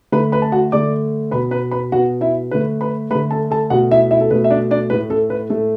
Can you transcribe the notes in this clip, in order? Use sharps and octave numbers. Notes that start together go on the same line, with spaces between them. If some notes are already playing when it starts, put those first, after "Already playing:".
D3 A3 B4 B5
B4 B5
A5
F#4 F#5
D3 A3 D5 D6
B2 B3 B4 B5
B4 B5
B4 B5
B2 B3 F#4 F#5
E4 E5
D3 A3 B4
B4 B5
D3 A3 B4 B5
A4 A5
A4 A5
B2 A3 F#4 F#5
E4 E5
E4 E5
A4
B2 A3 B4
E5
D4 D5
D4 D5
A2 A3 B4
A4
B4
A2 A3 A4